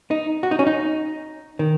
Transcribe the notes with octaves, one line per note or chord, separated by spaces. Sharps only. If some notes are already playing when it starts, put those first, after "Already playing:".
D#4
F#4
D#4
C#4
D#4
D#3